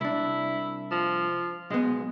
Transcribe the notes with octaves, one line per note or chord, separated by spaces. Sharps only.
C2 D4 E4
F3
B1 G#3 B3